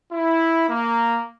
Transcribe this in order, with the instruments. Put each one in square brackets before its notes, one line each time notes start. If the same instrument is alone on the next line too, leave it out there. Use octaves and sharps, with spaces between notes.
[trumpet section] E4
A#3